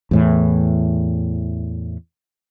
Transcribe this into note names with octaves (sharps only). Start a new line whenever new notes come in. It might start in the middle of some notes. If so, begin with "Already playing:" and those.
E2 A2 E3